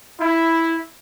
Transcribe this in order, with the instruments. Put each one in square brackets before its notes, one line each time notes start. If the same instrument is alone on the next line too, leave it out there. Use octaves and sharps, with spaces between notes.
[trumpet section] E4